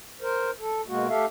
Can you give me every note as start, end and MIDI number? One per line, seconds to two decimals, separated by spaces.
0.21 0.51 70
0.21 0.51 72
0.60 0.81 69
0.88 1.08 47
0.88 1.08 56
0.88 1.08 58
0.88 1.08 66
1.09 1.26 57
1.09 1.26 67
1.09 1.26 69
1.09 1.26 76
1.09 1.26 77